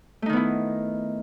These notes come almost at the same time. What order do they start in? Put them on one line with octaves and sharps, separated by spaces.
A3 D#4 D#3 B3 E4